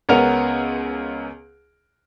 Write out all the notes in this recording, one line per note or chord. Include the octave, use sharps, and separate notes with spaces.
C#2 B3 C#4 A#4 F#5 F7